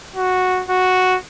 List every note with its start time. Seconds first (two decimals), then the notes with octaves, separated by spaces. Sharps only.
0.16 F#4
0.69 F#4